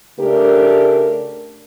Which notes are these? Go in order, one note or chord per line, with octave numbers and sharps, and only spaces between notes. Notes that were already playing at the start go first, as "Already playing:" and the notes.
C#3 A3 D4 G4 A#4